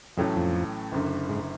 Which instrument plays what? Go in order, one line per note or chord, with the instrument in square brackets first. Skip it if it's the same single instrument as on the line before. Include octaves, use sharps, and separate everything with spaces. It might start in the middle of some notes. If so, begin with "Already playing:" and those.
[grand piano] A1 A2 F#3 A3 C#4 [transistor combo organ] F2
[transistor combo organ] F2
[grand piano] F#1 F#2 D3
[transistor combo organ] G#2